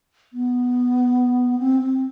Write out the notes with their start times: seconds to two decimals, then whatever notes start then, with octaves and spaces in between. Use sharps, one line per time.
0.33 B3
1.59 C4
1.80 C4